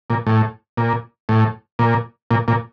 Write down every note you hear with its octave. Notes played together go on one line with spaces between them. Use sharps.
A#2
A2
A#2
A2
A#2
A#2
A#2